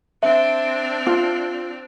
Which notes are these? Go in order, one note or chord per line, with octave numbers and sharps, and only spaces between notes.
C4 D4 E5
F4